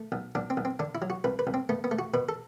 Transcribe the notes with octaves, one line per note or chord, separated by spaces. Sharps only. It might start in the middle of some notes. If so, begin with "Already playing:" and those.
Already playing: A3
B1
B1 D4
C4
B1
C4
D3 D4
E4
F#3
F#4
C2 B4
B4
C2
C4
A3 B3
B3
A3
F#4
B2 B4
A4